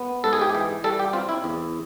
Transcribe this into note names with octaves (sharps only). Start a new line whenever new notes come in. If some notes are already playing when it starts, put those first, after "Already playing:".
Already playing: B3
G#2 A4
G#4
G4
G#4
E3
G3 A4
G4
C4 F4
E4
E2